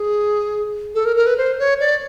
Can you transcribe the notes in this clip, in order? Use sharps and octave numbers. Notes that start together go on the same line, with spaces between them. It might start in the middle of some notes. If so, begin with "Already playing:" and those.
Already playing: G#4
A4
A#4
A#4
B4
C5
C#5
D5